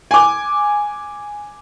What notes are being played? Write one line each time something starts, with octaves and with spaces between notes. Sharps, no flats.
G#5 D6